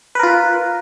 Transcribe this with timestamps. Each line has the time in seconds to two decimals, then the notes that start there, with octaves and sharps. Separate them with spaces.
0.15 B4
0.19 A#4
0.23 F4